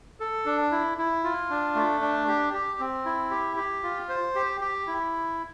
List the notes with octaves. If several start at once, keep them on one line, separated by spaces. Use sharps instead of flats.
A4
D4
E4
E4
F4
D4
A3
D4
G4
G4
C4
E4
G4
G4
F4
C5
G4
G4
E4